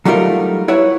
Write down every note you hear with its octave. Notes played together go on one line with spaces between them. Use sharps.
F#3 G3 A3 D#4 F4 A#4
E4 B4 C#5 F#5